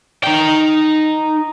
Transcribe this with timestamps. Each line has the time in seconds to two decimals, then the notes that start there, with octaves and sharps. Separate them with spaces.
0.24 D#4 G5